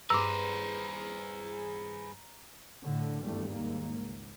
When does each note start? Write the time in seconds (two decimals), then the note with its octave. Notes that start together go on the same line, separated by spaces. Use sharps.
0.10 G2 G#4 B4 C5 A#5 D6 E6
2.84 A2 D3
3.22 G#1 E2 G2 G3 A3
3.51 G#1 D#2 G#2 A#3
3.99 C#2